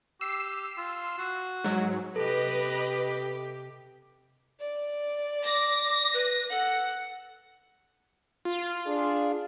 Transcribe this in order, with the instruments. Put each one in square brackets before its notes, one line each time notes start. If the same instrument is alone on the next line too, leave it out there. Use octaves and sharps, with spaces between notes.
[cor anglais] G4 [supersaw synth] E6 C7
[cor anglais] F4
F#4
[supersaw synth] G#2 F#3
[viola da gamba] C3 G4 [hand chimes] A4 [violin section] B4 D#5
[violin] D5
[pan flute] D6 [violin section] A#6
[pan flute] B4
[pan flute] A4 [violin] F#5
[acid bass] F4
[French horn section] D4 G#4